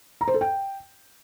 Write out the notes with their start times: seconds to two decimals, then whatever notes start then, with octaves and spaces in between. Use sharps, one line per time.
0.21 A#5
0.28 C5
0.34 A4
0.41 G5